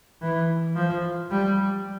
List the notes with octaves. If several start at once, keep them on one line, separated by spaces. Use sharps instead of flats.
E3
F3
G3